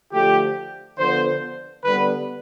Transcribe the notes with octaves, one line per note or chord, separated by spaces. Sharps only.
D3 F3 A3 G4
D3 F3 B3 C5
D3 G3 B3 B4